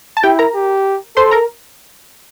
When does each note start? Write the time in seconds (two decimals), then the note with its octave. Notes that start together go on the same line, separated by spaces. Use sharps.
0.17 A5
0.23 E4 G4 G5
0.39 A#4 A#5
0.55 G4
1.16 A4 C5 C6
1.31 A#4 A#5